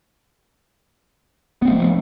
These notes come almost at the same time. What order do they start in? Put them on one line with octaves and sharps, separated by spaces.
B3 C4 A3 F3